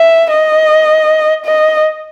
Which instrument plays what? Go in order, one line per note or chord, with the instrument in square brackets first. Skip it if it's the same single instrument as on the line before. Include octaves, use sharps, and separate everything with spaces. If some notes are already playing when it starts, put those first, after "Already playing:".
Already playing: [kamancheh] E5
D#5
D#5